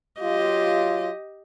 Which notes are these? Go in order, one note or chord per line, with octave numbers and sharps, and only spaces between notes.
F#3 F4 G4 D#5